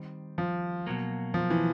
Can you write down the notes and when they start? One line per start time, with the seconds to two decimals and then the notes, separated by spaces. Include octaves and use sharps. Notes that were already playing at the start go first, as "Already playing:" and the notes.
Already playing: D#3 G3 C4
0.38 F3
0.86 B2 F#3 A#3
1.34 F3
1.50 E3